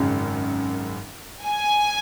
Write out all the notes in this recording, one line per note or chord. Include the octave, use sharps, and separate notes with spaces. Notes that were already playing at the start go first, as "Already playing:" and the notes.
Already playing: G#1 F#2 C#3
G#5